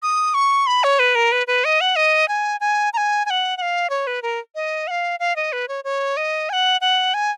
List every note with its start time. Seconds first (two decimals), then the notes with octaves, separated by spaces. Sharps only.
0.03 D#6
0.34 C#6
0.67 B5
0.84 C#5
0.99 B4
1.15 A#4
1.32 B4
1.47 B4
1.65 D#5
1.81 F#5
1.96 D#5
2.28 G#5
2.60 G#5
2.93 A#5
2.97 G#5
3.26 G#5
3.30 F#5
3.57 F#5
3.62 F5
3.90 C#5
4.07 B4
4.22 A#4
4.55 D#5
4.87 F#5
4.91 F5
5.20 F5
5.36 D#5
5.53 B4
5.68 C#5
5.84 C#5
6.17 D#5
6.50 G#5
6.53 F#5
6.81 F#5
7.14 G#5